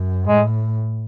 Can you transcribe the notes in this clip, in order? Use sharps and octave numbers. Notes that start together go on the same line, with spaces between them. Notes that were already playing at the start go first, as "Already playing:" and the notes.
Already playing: F#2
A2 G#3